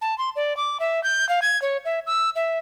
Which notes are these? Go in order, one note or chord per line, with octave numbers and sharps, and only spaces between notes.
A5
C6
D5
D6
E5
G6
F5
G#6
C#5
E5
E6
E5